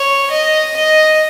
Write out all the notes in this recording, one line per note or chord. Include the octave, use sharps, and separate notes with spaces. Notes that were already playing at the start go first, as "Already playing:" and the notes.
Already playing: C#5
D#5
D#5